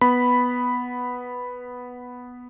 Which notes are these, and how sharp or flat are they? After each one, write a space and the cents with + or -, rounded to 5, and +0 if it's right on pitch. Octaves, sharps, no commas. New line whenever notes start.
B3 +0 B5 +0